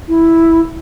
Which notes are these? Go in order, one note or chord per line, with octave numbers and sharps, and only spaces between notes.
E4